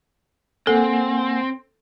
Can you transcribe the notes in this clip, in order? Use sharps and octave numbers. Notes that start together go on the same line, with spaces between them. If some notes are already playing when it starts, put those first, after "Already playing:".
A#3 C4 A4 F#5 G#5